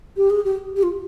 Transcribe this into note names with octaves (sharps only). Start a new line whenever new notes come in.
G4
G#4
G4
G4
F4